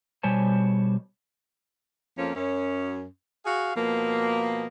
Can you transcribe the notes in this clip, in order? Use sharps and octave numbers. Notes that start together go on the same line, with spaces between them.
B2 G3 C5 C#5 G#5 A5
F2 F3 A#3 C#4
F#2 C#4
F#4 G#4 F5
B2 F3 A#3